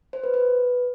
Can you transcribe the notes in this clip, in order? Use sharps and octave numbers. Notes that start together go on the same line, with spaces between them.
C5
B4
B4